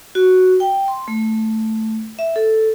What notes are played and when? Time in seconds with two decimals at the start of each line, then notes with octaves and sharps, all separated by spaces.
0.15 F#4
0.60 G5
0.88 C6
1.08 A3
2.19 E5
2.36 A4